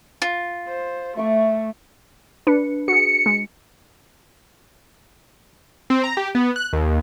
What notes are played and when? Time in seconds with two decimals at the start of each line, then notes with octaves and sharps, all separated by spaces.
0.22 F4
0.68 C5
1.17 A3 E5 C#6 D6
2.47 D4 B4 C#7
2.88 F#4 G#4 C#7
3.26 G#3
5.90 C4
6.04 A#5
6.17 G4
6.35 B3
6.56 F#6
6.73 D#2